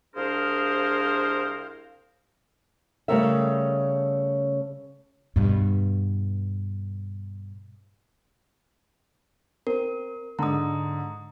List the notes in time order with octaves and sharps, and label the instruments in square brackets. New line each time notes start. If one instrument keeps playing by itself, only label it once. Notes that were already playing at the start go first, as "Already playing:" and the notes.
[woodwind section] C2 D4 G#4 A#4 C5 F5
[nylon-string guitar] C#3 G3 A3 C#4 A#4 E5
[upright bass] G2 B2
[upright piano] C4 [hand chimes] A#4
[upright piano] G#2 D3 [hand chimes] A#5 D#6